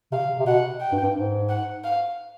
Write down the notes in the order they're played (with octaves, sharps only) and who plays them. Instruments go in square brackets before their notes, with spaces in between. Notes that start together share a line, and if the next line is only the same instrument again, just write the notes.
[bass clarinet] C3 [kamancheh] F5
[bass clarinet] C3
C3
[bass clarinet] B2 [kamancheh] F#5
[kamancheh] G5
[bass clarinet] G2
G2
G#2
[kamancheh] F#5
F5